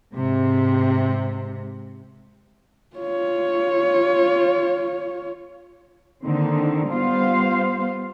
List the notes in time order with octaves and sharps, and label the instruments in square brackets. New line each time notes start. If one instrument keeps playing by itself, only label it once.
[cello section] G#2 C3
[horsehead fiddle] F4 C#5
[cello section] D3 D#3 A#3 C4 D#4
G3 B3 F4 C5 F5